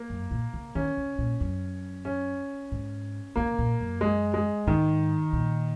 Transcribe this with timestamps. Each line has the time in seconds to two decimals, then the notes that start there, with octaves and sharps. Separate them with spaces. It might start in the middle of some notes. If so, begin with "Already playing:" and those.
Already playing: A#3
0.10 F#2
0.31 A#2
0.53 C#3
0.75 D#3 C#4
0.97 C#3
1.18 A#2
1.41 F#2
2.05 C#4
2.71 G#2
3.36 C#3 A#3
3.58 A#2
3.80 F#2
4.01 G#3
4.34 G#3
4.67 G#2 D#3
5.33 A#2